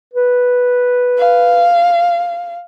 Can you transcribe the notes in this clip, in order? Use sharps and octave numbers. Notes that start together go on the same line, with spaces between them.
B4
F5